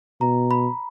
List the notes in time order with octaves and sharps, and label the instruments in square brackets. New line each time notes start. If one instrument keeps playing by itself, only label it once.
[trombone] B2 [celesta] A#5
[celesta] B5